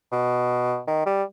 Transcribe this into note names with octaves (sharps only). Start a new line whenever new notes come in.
B2
D#3
G3